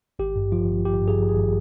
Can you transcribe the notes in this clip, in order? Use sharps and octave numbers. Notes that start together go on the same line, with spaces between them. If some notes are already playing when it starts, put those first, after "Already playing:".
G#1 G4
G2
F3 F4
G#1
G#1 G4
G2
G#4
F3
G#4
G#1